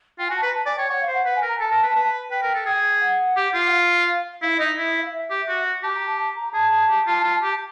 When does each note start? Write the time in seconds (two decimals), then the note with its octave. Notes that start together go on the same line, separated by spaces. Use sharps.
0.19 F4 G5
0.28 G#5
0.31 F#4
0.36 A5
0.43 B4 A#5
0.54 A5
0.66 D5 G#5
0.77 C#5 G5
0.90 C#5 F#5
1.01 F5
1.07 C5
1.13 F#5
1.25 B4 F#5
1.36 G#5
1.42 A#4
1.48 A#5
1.60 A4 A5
1.71 A#4
1.83 B4
1.96 B4
2.31 B4 G5
2.42 A#4
2.55 A4
2.66 G#4
3.01 F#5
3.36 G4
3.54 F4
3.66 F#5
3.72 F5
4.42 E4 F5
4.49 E5
4.57 D#5
4.60 D#4
4.65 E5
4.78 E4
5.01 F5
5.13 E5
5.30 G4
5.48 F#4
5.83 G4 A5
5.95 A#5
6.07 A5
6.19 A5
6.35 A#5
6.53 G#4 A5
6.71 G#4
6.89 G4
7.07 F4
7.24 F4
7.42 G4